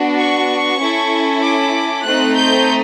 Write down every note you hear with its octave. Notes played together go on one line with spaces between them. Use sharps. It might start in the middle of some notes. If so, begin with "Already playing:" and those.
Already playing: B3 D4 F#4
C#6
C#4 E4 A4
D6
A3 C4 D#4 F#6
G6